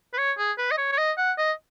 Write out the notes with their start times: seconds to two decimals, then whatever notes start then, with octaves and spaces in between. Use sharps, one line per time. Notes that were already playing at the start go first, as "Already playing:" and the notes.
0.13 B4
0.18 C#5
0.38 G#4
0.58 B4
0.71 D#5
0.78 C#5
0.92 C#5
0.98 D#5
1.18 F#5
1.38 D#5